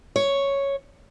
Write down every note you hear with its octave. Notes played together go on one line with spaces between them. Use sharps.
C#5